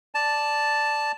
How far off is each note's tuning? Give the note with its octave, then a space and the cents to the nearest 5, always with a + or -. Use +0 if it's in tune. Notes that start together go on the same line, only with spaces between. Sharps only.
D5 +0 A5 +0